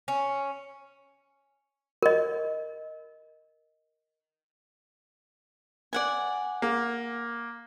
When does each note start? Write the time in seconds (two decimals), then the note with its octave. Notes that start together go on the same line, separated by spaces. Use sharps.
0.08 C#4
2.03 A#4 D#5
5.93 D5 F#5 G#5
6.62 A#3